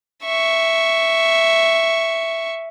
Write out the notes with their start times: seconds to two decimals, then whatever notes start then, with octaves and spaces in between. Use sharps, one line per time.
0.24 E5 C#6